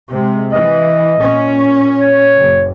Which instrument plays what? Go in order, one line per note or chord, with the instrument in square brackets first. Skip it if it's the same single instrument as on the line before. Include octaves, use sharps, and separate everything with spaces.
[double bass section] C3 G#3
[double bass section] E3 [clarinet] D#5
[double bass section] A#2 C#4
[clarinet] C#5
[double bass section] F#1